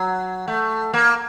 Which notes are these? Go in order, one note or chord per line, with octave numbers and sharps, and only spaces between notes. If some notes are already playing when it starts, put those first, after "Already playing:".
Already playing: F#3
A3
A#3